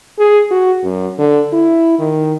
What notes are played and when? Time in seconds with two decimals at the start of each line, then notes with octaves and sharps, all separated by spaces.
0.18 G#4
0.51 F#4
0.84 F#2
1.19 D3
1.53 E4
1.99 D#3